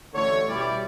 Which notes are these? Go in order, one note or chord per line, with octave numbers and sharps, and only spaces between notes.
A1 A2 D3 A3 A4 C#5
B2 G3 E4 D5